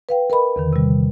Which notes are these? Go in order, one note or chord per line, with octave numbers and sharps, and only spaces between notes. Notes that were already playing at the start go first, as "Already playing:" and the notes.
B4 F5 G5
A#4 B4 D#5 B5
E2 D3 D#3
C3 G3